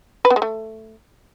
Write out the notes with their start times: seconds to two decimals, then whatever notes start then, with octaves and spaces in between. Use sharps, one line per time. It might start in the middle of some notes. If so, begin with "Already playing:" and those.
0.25 B4
0.30 B3
0.36 G#3
0.42 A3